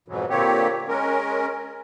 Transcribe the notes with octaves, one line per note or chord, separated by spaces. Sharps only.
F2 G#2 B2 E3 F#3
A#2 D3 A#3 C4 G4 C#5
G#3 C#4 A#4